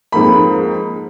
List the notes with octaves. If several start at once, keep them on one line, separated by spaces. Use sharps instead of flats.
F2 G#2 A#3 B5